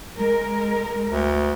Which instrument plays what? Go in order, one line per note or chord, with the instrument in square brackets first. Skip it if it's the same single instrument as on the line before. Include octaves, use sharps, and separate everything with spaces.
[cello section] G#3 A#4
[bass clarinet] D2